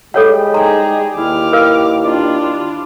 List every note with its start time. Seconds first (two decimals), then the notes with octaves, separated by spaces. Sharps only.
0.14 G3 G#3 G4 A4 C#5 F#5
0.54 D#4 G#4 C5 G5 A#5
1.17 D#2 E4 D6 F6
1.53 A#4 B4 F5
2.04 D4 F4 D5